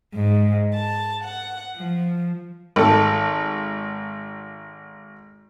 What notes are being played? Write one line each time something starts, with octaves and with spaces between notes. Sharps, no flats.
G#2
A5
F#5
F3
G#1 A4